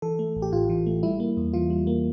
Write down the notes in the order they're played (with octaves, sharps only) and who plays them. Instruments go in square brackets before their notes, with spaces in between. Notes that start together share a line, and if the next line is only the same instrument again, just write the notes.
[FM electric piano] E3 A4
A3
A1
G4
A2 F4
E3
A3
G3 E4
A#3
E2
E3 F4
G3
A#3